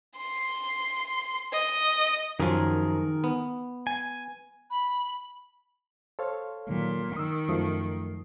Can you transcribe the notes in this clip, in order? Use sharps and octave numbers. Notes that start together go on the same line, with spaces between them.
C6
D#5
F#2 D#3 F3 G#4 A#4
B3
G#5
B5
A4 C5 C#5 F5
A#2 D#3 F#3
D#3 D#6 E6
F#2 F3 A3 D#6 C7